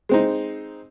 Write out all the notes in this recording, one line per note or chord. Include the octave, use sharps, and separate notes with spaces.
G#3 C4 D#4